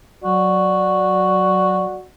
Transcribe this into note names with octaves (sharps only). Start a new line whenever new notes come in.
F#3 F#4 D5